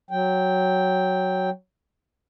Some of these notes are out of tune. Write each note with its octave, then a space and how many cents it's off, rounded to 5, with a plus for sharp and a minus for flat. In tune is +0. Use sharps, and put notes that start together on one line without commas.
F#3 +0 G5 +0